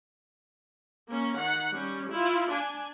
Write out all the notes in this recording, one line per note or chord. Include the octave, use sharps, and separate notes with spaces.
A#3 C#4
D#3 F#5
G3 C#4
E4 F4
D4 G#5